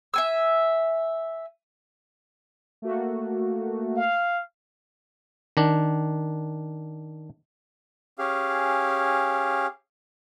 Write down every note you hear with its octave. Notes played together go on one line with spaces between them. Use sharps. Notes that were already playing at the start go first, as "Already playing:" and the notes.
E5 G#5 E6
A3 A#3 F#4
F5
D#3 D4
C#4 G4 G#4 F5